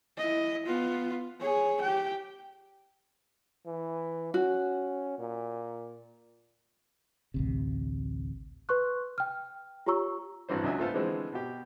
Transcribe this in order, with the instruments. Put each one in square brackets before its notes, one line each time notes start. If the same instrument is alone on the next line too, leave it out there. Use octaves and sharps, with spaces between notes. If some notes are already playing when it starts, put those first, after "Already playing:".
[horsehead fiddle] E4 D#5
B3 F4
G#4 C#5
G4 G5
[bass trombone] E3
[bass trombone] C#4 [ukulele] F#4
[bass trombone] A#2
[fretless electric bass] A1 D2 C3
[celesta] B4 C6 C#6 F#6
G5 F6
F4 G4 C#5 A#5 C#6 E6
[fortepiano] G#1 G2 E3 C5
C#2 F#3 D4 D#5 E5 G#5
A3 B3 F4 A4 C5
D3 E3 F3 G#3 C4
B2 G4